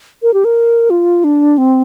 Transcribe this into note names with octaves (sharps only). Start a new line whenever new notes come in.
A#4
G4
A#4
F4
D4
C4